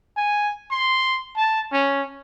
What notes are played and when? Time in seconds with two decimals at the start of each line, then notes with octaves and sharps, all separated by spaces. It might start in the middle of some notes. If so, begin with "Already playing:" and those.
0.17 G#5
0.71 C6
1.37 A5
1.73 C#4